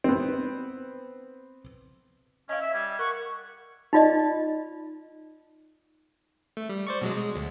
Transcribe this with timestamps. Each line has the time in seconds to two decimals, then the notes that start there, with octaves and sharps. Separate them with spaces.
0.04 B3 C4
2.49 C#4 D#5 F5
2.61 E5
2.74 G3 G#6
2.99 A#4 F#5 C#6
3.93 D#4 F4 D5 D#5
6.57 A3
6.69 G3
6.87 C5 D5 C#6
7.01 B2 F#3 G#3
7.17 G#3
7.36 D2